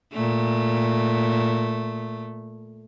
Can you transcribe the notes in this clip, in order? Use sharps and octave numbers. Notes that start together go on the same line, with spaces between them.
A#2 A3